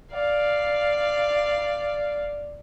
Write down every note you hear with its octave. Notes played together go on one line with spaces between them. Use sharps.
D5 F5